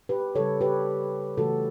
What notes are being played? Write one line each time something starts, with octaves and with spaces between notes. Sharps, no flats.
G4 B4
C#3 G3 A4 C#5
G4 B4
C#3 E3 A3 F#4 A4